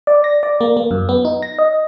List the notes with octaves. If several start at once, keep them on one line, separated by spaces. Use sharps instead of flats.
D5
A#6
D5
A#3
A#3
F#2
B3
D#4
A#6
D#5